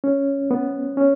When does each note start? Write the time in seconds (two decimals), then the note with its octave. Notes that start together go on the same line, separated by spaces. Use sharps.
0.04 C#4
0.51 B3
0.97 C#4